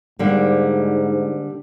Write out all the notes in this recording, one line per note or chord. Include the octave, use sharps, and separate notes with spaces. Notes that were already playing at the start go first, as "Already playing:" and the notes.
G#2 D3 G3 A#3